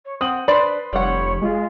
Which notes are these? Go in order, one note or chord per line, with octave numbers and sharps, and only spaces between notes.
C#5
C4 F#5 D#6 F#7
D4 B4 C5 D5 B5 C6
F1 G3 C#5 F#5
G#3 F4